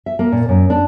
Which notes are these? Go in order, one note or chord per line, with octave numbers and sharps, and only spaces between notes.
E5
A#3
A#2
F#2
D4